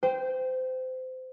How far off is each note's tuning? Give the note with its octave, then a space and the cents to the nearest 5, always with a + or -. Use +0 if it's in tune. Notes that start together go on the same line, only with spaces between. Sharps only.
C5 -25 G5 +0